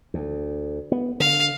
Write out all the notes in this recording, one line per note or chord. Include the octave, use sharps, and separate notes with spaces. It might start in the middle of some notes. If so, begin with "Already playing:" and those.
D2
B3
D3 F5